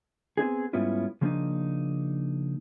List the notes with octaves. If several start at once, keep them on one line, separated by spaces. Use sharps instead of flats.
B3 C4 D#4 G#4
G#2 G3 B3 C#4 E4 F4
C#3 F3 A#3 B3 D4 D#4